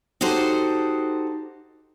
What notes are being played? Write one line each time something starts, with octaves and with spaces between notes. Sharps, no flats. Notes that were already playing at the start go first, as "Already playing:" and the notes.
D#4 F#4 G4 A4 C5